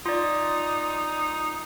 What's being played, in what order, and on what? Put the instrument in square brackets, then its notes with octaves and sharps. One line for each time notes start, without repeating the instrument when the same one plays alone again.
[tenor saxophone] D#4 [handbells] F4 D5